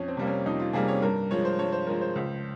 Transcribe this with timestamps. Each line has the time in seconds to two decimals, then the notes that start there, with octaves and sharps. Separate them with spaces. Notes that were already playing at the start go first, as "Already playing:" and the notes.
Already playing: F2 C#4
0.08 C4
0.17 C3 G3 A#3
0.27 C#4
0.46 F2 D#4
0.60 F4
0.73 C3 G3 A#3 G#4
0.88 C#5
1.02 G2 A#4
1.31 F3 G#3 C#5
1.45 C5
1.58 G2 C#5
1.72 C5
1.87 F3 G#3 A#4
2.01 C5
2.16 C#2